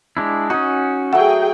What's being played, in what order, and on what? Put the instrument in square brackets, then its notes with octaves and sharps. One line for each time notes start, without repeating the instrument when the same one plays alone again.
[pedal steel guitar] G#3 D4 E4
[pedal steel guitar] C#4 F#4 [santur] D#4 G#5
[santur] F#3 A3 [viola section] G#4 G5 [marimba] F#5